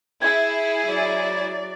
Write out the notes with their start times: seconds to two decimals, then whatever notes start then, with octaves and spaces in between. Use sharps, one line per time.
0.22 E4 G#4 G#6
0.86 F#3 D5